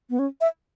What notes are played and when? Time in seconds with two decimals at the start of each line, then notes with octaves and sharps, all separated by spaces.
0.10 B3
0.19 C#4
0.41 E5